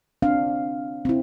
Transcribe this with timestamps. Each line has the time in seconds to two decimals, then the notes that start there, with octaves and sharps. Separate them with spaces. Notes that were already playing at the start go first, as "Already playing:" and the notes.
0.22 C4 D4 F5
1.05 C4 E4